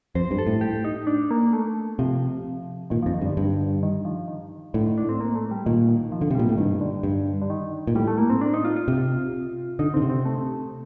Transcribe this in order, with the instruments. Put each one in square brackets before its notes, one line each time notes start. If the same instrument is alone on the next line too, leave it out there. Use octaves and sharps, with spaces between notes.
[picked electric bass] F2 [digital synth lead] C5
[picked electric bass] G2
[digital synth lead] A4
[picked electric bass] A2
[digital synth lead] G4
D#4
D4
A#3
A3
[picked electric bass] C3 [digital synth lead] F3
[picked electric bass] A#2 [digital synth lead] D#3
[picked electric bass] F2 [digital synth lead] F3
[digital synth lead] D#3
[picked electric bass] G2
[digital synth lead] D3
[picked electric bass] G2
[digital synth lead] D#3
F3
D#3
[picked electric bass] A2 [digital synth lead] D3
[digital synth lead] D#3
D4
C4
A#3
A3
G3
[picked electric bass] A#2 [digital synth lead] D#3
[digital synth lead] D#3
F3
[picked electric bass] D3
C3
[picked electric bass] A#2 [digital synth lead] G3
[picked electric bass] A2
[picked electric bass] G2 [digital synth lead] D#3
[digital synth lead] D3
[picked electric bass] G2
[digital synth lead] D3
D#3
[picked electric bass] A#2
[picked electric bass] A2 [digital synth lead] G3
[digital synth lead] A3
A#3
C4
D4
D#4
F4
F4
[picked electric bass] C3
[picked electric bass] D3 [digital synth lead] D#4
[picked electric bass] D3 [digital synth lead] C4
[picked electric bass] C3
[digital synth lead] C4
A3